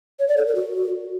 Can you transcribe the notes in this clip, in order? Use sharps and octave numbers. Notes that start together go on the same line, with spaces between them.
C#5
D5
A4
A#4
F#4